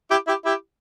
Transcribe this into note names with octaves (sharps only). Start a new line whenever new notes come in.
E4 G4
E4 G4
E4 G4